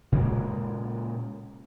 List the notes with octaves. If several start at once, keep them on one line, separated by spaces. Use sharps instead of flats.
A#2 C#3 G#3 A#3